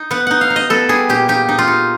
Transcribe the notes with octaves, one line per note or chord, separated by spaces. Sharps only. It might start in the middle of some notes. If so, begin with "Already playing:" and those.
Already playing: D#4
B3 F#5
D#4 F#5
F5
D#4
D#5
B3 A4
G3 G#4
A#2 G4
D#4 G4
D#4
F4
D#4